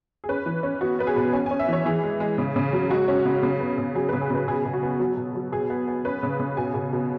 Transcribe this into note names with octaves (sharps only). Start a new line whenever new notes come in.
G#4
C#4 B4
E3
C#4
B3 F#4
B3 B4
G#4
B2
C#4 G#5
G#5
C#4
E5
E3 C#5
E3 G#4
G#3
G#3
C#3
C#3
F#3
G#3 F#4
C#4
C#3
C#3
B3
C#3
F#3 G#4
B4
C#3
G#4
C#3 B4
B2 G#4
B2
F#4
B3
F#3
B2
F#3
B2 G#4
B3
B3
C#4 B4
C#3
C#3
B2 G#5
B2
B2